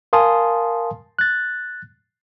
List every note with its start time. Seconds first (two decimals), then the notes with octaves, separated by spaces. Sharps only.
0.13 A#4 F5 G#5 A5 C6 D#6
1.19 F#6 A6